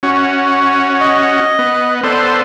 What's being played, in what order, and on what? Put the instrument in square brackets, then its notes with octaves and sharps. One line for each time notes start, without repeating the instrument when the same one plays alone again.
[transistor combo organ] C#4 F#4
[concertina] C#5
D#5
[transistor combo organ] B3
[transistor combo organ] B3 A4 C5 [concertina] D5 C6